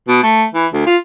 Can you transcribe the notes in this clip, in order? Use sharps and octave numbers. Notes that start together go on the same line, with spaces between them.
B2
A3
E3
D2
F4